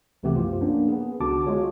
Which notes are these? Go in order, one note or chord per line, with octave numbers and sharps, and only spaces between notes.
C2 C3 E3 A3 B3 G4
F#2 F3 F4
A#3 B3 C#4 D4
B3 G#4
C#2 D3 B3 F#4 A5 D6
G#3 F4 F#4 G#4 C#5